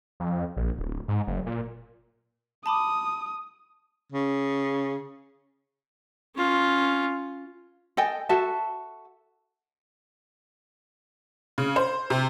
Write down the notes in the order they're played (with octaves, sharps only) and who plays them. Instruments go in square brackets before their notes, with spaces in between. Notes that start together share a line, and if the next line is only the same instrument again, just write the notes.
[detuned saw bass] F2
A#1
D1
G#2
F#1
A#2
[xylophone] A5 B5 D6 [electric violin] D#6
[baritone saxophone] C#3
[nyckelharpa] C#4 F4
[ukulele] A4 D#5 G5 G#5
F#4 A4 E5 A5
[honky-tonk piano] C#3
C5
C3